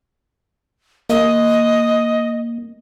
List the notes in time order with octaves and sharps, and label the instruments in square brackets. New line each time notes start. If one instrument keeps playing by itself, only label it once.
[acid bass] A#3 [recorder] D#5